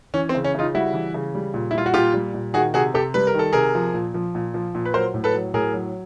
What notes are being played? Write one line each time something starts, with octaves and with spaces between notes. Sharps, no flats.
E3 C#4
C4
C#3
C#4
C#3 D#4 F4
G3 E4 F#4
E3
C#3
G3
A#2
E4
G3 F4
F#4
A#2 F4 G4
G3
A#2
D#3 F#4 G#4
C3 F#4 G#4
C3 G4 A4
G3 B4
A#4
D#3
A4
C3 G#4 A#4
F3
A#2
F3
A#2
F3
A#2
B4
F#3 A#4 C5
A2
A4 B4
F#3
A2 G#4 A#4
F#3